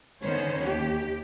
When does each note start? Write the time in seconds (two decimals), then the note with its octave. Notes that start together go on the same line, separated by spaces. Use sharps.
0.23 D3 D#3 B3 C#4 C5 C#5
0.59 D#2 G4